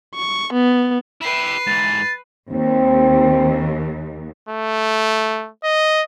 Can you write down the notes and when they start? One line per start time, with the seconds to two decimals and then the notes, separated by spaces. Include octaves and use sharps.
0.15 C#6
0.53 B3
1.21 E4 G4 B4 C7
1.67 G#2 E3 A6
2.50 D#2 C4
4.49 A3
5.64 D#5